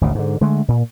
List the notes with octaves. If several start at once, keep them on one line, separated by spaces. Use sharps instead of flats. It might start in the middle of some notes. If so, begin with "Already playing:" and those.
G#1 D2 C#3
G#2 D3
D3 G#3 A3
A#2